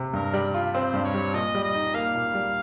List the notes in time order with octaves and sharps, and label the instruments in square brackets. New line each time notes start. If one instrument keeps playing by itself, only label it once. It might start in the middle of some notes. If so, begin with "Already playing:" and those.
Already playing: [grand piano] C3
[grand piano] G2 [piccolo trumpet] A#4
[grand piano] G3
F4
[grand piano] C4 [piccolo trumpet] C5
[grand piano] G2
[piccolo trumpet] C#5
[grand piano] G3
[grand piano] A#2 [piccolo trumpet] D#5
[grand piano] G3
[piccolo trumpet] D#5
[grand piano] D#4
[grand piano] A#3 [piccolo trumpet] F5
[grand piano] A#2
G3